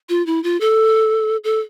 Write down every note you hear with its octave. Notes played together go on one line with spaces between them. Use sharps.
F4
E4
F4
A4
A4